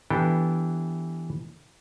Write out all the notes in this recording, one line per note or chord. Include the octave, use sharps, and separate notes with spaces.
E3 B3 D4 G4 A4 G5